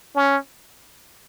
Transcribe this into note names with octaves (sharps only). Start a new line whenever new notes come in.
C#4